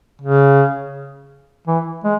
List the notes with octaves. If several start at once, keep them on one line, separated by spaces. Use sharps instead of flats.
C#3
E3
G#3